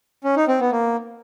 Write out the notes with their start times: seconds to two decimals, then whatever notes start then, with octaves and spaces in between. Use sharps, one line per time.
0.24 C#4
0.36 D#4
0.48 C4
0.60 B3
0.72 A#3